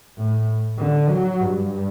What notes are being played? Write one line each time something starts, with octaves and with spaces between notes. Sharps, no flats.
A2
D3
F#3
G2